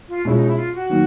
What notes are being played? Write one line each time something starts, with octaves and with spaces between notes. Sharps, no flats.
F4
B2 G#3 C#4 E4 F4
D#4
E4
F4
F#4
D#3 F#3 A#3